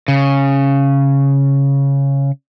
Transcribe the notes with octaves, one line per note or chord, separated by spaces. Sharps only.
C#3